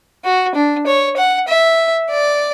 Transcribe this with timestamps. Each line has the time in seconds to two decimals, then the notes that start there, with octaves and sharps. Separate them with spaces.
0.25 F#4
0.55 D4
0.87 C#5
1.17 F#5
1.48 E5
2.10 D5